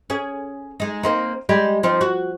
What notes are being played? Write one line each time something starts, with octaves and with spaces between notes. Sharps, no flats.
C#4 G#4
G#3 D#4
A#3 C4 D#4
G3 G#3 G4
F3 C4 D#4
F#4